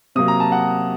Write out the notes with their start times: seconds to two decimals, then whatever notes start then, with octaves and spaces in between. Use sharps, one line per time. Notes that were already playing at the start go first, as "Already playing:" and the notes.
0.15 C3 F#3 A#3 D#6
0.28 A#5
0.40 A5
0.52 F#5